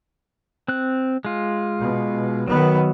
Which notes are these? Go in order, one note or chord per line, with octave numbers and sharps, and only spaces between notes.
C4 F#6
G#3 F4
B2
D#3 F#3 B3